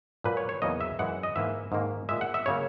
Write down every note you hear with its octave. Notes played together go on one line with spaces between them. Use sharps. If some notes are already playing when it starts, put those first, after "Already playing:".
A#2 F#3 A#3 B4
C#5
C#5
E2 C#3 F#3 A#3 D#5
E5
F#2 E3 G#3 F#5
D#5
G#2 E3 A#3 E5
G#2 D#3 A#3
A#2 G#3 E5
F#5
E5
C#3 F#3 A#3 C#5